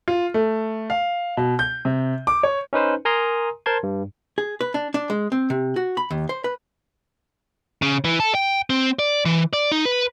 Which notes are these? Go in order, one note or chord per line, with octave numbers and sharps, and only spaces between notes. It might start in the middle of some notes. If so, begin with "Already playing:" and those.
F4
A3
F5
B2
G6
C3
D6
C#5
C#4 D#4 B4 C5
A#4 G#5 A#5 C6 D#6
A#4 C5 A5 C6 G#6
G2
G#4
B4
D4
D4
G#3
C4
C3
F#4
B5
D#2
C5
B4
C#3
E3
A4
G5
C4
D5
E3
D5
D#4
B4